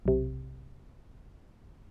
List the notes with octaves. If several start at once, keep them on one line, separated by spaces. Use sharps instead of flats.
B1 C3